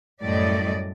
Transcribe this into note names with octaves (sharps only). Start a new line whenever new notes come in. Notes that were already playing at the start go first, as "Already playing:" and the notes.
F#2 A2 G3 A3 D5 D#5